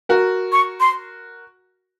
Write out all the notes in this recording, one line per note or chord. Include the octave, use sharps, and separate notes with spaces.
F#4 A#4
C#6
C6